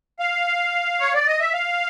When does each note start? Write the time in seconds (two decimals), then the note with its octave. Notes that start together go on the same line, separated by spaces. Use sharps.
0.19 F5
1.00 C#5
1.14 D5
1.27 D#5
1.40 E5
1.53 F5